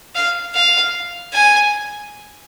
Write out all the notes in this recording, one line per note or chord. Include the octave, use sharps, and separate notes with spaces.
F5
F5
G#5